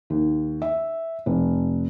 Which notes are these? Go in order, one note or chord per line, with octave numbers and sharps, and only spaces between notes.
D#2
E5
F1